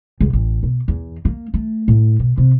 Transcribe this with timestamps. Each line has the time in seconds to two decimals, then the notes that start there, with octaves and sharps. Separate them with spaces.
0.21 C#2
0.33 A1
0.63 B2
0.88 E2
1.25 A#3
1.54 A3
1.88 A2
2.19 B2
2.38 C3